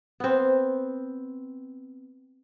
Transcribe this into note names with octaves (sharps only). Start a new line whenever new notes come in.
B3 C4